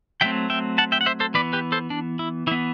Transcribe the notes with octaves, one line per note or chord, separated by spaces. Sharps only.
F#3 A3 C4 E5 G5
E5 G5
F#5 A5
E5 G5
F#5
C5 E5
A4 C5
E3 B3 B4 D5
G4 B4
A4 C5
D4
E4
E3 B3 E4